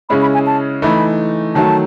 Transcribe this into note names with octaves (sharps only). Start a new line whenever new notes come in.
C#3 G#3 C#4 E4 B5
B5
G#5
A5
E3 A3 D#4 B5
D#3 F#3 A3 A5